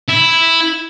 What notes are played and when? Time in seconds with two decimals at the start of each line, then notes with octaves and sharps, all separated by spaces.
0.09 E4